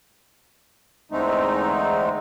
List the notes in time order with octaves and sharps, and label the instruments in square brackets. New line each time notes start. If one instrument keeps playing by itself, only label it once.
[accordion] E2 D3 G#3 A3 C4 D#4